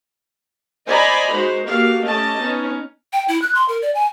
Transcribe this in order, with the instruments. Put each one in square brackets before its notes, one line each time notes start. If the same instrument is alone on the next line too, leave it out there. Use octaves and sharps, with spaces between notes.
[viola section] C5 D5 D#5 G#5 A#5 B5
G#3 D#4 F#4 C5
A#3 F#4 G4 A4 F5
A3 C#4 G4 D#5 A5
B3 C#4 D#4
[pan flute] G5
E4
F#6
C6
A#4
D5
G#5